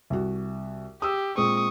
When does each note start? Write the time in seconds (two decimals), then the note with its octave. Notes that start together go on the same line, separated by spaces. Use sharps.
0.10 C2 F#4
1.02 G4 D#6 E6
1.37 A#2 G#3 C4 C#6 D#6